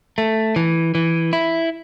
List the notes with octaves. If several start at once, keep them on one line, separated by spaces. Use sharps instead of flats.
A3
E3
E3
E4